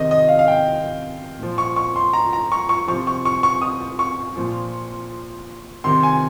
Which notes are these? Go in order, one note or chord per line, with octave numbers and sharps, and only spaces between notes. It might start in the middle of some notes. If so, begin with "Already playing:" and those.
Already playing: C3 D#3 D#5
D#5
F5
F5
G5
A#2 F3
C#6
C#6
C6
A#5
A#5
C#6
C#6
C3 F3 C#6
C#6
C#6
C#6
D#6
C#6
A#2 F3
C3 D#3 C6
G#5